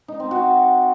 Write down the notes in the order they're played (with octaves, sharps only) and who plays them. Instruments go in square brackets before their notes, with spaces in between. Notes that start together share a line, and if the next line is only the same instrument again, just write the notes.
[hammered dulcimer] D#4
C4
F#4